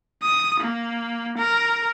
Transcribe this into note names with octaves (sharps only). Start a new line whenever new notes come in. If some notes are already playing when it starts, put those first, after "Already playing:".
D#6
A#3
A#4